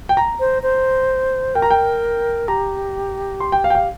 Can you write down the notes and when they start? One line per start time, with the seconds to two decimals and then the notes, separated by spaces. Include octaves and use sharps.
0.09 G5
0.17 A#5
0.40 C5
0.63 C5
1.55 A#4 G5
1.62 A#5
1.70 G5
2.48 G4 A#5
3.40 C6
3.52 G5
3.64 F5
3.70 G5
3.75 F5